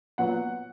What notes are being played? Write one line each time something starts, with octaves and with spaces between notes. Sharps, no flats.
A#2 F#3 B3 F#5